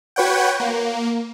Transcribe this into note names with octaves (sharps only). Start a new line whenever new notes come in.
F#4 B4 C#5 F#5 G5
A#3